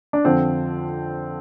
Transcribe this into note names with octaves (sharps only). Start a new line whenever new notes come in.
D4
F2 D3 F3 C4